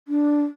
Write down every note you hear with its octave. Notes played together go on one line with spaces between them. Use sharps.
D4